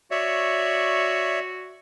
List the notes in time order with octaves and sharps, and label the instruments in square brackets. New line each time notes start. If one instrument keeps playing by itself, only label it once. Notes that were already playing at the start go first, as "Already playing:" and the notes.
[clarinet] F#4 [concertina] C#5 D5 E5